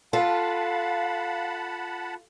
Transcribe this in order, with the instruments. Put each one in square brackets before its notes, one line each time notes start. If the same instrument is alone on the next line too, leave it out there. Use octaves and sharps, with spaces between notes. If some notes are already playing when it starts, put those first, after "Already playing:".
[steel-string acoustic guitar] F4 A4 [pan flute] F5 [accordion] F#5 A5 B5